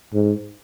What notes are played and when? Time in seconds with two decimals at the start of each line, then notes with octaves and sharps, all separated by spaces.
0.13 G#2